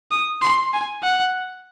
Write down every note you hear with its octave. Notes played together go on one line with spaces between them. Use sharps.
D#6
C6
G#5
F#5